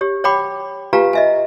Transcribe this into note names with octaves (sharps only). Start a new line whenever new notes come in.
G4 C#5
C#5 F#5 G5 B5 D6
F4 G4 B4 F5 G#5 A#5
D#5 E5 G#5